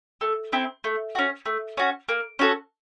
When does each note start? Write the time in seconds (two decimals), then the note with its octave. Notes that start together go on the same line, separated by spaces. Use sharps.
0.21 A3
0.52 C4 E4
0.84 A3
1.15 C#4 F#4
1.46 A3
1.77 C#4 F#4
2.09 A#3
2.39 C#4 F#4 A4